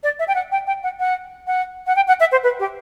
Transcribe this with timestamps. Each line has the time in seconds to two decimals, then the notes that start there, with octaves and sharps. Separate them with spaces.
0.03 D5
0.19 E5
0.27 G5
0.35 F#5
0.51 G5
0.67 G5
0.83 F#5
0.99 F#5
1.47 F#5
1.86 F#5
1.96 G5
2.07 F#5
2.20 E5
2.31 C5
2.43 B4
2.59 G4